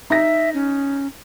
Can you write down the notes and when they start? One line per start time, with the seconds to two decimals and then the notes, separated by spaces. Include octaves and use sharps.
0.10 D#4 E5 A#6
0.54 C#4